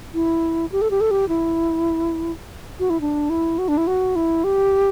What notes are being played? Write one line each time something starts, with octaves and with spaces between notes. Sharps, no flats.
E4
G4
A4
G4
A4
G4
E4
F#4
E4
D4
E4
F#4
D4
E4
F#4
E4
G4